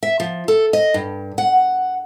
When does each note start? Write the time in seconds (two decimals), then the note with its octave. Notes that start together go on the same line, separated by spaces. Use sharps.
0.03 E5
0.20 F3
0.48 A4
0.73 D#5
0.94 G2
1.38 F#5